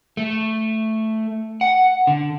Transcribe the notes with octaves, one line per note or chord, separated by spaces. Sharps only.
A3
F#5
D3